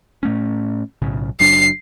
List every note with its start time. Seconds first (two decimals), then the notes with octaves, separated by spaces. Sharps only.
0.23 A2 A3 C#4
1.02 B1 A2 C#3
1.40 F#1 F#3 D4 C7